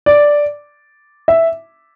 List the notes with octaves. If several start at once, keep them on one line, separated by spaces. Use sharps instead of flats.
D5
E5